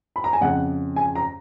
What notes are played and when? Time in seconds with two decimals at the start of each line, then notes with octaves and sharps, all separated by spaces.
0.16 B5
0.24 A#5
0.33 G#5
0.41 F2 C#3 F#5
0.96 G#5
1.16 A#5